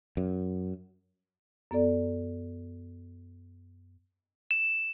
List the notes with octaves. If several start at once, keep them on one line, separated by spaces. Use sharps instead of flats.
F#2
F#2 B3 A4 D5
E7